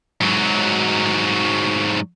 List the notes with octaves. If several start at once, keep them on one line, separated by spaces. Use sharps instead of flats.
G#2 F#3